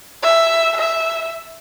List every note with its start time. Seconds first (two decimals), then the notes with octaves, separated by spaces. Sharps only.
0.22 E5
0.77 E5